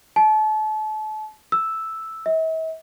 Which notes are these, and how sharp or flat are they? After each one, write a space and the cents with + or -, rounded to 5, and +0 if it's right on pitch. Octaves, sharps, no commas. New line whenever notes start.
A5 -35
E6 -5
E5 -45